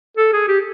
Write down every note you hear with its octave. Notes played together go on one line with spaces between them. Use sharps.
A4
G#4
G4